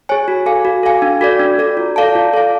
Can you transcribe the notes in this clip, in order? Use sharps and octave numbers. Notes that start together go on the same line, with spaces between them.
G#4 C#5 G#5
F#4
A4 F5 G#5
F#4
A4 F5 G#5
D4
F#4 A4 D5
D4
F#4 A4 D5
F4
A4 D5 F5 A5
F4
A4 D5 F5 A5